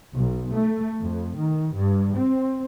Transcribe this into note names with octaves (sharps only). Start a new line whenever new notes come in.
B1
A3
F2
D#3
G2
C4